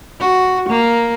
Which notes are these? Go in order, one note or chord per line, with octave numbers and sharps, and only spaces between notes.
F#4
A#3